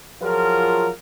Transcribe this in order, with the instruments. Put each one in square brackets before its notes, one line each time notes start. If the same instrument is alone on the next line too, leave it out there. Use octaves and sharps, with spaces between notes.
[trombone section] F3 F#3 F4 G#4 A#4